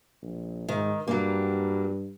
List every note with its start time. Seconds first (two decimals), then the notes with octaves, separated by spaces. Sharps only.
0.22 A#1
0.68 G#2 D#3
1.07 G2 F#3 G3 A#3